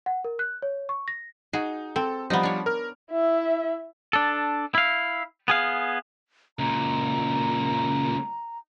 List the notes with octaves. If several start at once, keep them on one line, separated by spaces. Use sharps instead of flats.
F#5
A#4
F#6
C#5
C#6
A#6
D#4 F#4 G#4
C4 A4
F3 G3 B3 D#4 F4
D4 C#5
A#4 F6
E4 E5
D4 A4
E4 F5
B3 G#4 F5
C#2 A#2 A#5